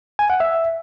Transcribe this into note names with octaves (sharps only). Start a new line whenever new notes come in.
G#5
F#5
E5